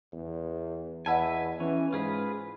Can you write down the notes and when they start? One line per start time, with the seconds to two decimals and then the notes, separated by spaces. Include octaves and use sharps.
0.13 E2
1.06 E2 B4 D#5 E5 F#5 G#5 A5
1.60 E3 C#4
1.92 G#2 F4 G#4 B4